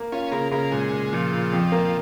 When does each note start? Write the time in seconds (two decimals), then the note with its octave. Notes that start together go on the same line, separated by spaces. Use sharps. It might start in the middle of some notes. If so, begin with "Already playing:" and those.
Already playing: A#3
0.12 C#4 F4
0.31 C#3 A#3
0.52 C#3 A#3
0.71 A#2 G#3
0.91 A#2
1.12 A#2 F3
1.32 A#2
1.52 F2
1.72 A#3